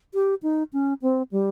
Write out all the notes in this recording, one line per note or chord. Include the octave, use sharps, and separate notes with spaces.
G4
D#4
C#4
C4
G3